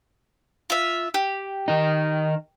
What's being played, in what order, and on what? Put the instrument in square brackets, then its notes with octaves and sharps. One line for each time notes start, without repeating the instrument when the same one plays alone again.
[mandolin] F4 E5
G4
[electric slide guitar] D#3 D#4